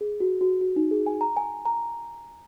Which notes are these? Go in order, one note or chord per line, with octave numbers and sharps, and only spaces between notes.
G#4
F#4
F#4
F#4
D#4
G#4
G#5
A#5
G#5
A#5